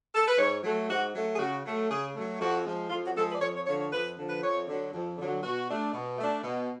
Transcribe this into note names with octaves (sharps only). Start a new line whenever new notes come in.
A4
B4
G#2 C#5
F#3 A3
G#2 F#4
F#3 A3
G#4
C#3 F#4
F#3 A3
C#3 G#4
F#3 A3
F2 F#4
F3 G#3
F2 F4
F#4
F3 G#3 A4
B4
D5
F2 C#5
C#5
D3 F3 C#5
C#5
F2 B4
D3 F3
B4
F2 C#5
D3 F#3
F2
D3 F#3
B2 F#4
A3 D4
B2
A3 D4
B2